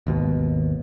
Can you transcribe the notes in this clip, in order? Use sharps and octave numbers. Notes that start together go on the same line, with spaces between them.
G#1 D#2 B2